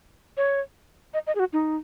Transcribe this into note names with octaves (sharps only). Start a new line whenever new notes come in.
C#5
D#5
D#5
G#4
F#4
D#4